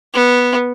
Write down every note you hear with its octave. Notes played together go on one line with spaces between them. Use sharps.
B3